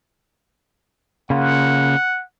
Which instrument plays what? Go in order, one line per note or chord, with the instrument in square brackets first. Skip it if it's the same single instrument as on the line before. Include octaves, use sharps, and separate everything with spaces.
[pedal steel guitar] C#3 A#3 F4 [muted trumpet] F#5